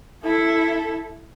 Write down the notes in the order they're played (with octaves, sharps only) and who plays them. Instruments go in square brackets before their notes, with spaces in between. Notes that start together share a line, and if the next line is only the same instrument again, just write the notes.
[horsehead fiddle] E4 A4